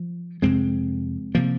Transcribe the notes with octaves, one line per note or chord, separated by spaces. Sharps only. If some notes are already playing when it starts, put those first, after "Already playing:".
Already playing: F3
F2 C3 G#3 C4
C3 F3 A#3